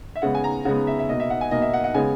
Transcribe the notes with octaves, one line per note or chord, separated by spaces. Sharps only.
E5
C#3 G#3 B3 F#5
G#5
A#5
C#3 G#3 B3 F#5
E5
E5
B2 A#3 D#5
E5
F#5
G#5
B2 A#3 D#5
E5
F#5
F#5
C#3 G#3 B3 G#5